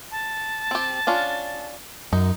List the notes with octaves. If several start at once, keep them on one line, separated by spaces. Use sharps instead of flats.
A5
C4 G4
C#4 D4 F4
F#2 D#4